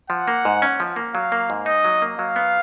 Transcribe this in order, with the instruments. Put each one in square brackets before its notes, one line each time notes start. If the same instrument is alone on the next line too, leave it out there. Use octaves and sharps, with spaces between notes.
[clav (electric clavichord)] F3 [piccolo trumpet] F#5
[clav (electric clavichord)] A#3
G#2
C#4
F3
A#3
[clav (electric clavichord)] F#3 [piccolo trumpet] F5
[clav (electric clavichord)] A#3
G#2
[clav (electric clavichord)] D#4 [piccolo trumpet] D#5
[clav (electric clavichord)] F#3
A#3
[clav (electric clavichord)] F#3 [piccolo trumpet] F5
[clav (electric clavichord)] B3